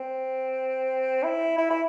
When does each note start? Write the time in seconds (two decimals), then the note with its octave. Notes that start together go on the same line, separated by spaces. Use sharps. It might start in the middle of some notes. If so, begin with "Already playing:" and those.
Already playing: C4
1.23 E4
1.58 E4
1.70 E4